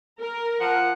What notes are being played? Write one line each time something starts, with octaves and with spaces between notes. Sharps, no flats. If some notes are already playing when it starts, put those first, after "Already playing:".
A#4
F3 F#5